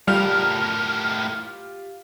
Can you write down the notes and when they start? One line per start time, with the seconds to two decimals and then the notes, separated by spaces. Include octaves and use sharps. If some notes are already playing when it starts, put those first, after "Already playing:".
0.08 A2 G3 F4 G4 A#4 F5 F6